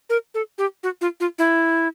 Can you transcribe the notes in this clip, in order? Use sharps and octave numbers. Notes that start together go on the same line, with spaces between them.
A#4
A4
G4
F#4
F4
F4
E4